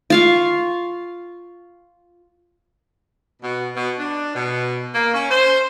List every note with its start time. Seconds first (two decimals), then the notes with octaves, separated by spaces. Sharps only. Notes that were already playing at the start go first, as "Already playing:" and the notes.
0.10 F4 F5 C#6
3.42 B2
3.76 B2
3.99 D4
4.35 B2
4.95 A#3
5.14 C#4
5.30 C5